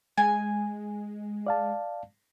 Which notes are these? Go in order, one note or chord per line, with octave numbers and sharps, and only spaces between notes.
G#3 G#5
D5 F5 A5